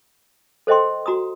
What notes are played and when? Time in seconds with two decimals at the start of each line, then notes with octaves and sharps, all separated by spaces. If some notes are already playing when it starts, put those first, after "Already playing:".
0.67 A4 C5 D#5 G5 C6
1.06 F#4 A#5 C6 D#6